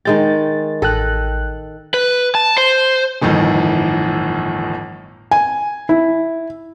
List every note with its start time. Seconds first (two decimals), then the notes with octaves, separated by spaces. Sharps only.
0.05 D#3 G#3 G5 A6
0.82 A1 A4 D#5 G5 F#6
1.94 B4
2.35 A5
2.58 C5
3.21 G1 F2 A2 D#3 E3
5.31 G#5
5.89 E4